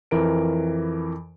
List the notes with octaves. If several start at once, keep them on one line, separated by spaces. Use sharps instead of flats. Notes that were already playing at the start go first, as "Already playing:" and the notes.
F2 E3 A#4 D7